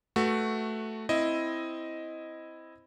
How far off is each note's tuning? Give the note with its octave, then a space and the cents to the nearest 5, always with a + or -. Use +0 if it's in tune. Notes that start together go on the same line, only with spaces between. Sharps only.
A3 +0 F#4 +0 B4 +0
C4 +0 E4 +0 D#5 +5